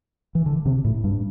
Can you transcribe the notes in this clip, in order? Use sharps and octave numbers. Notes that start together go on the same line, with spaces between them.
E3
D3
C3
A2
G2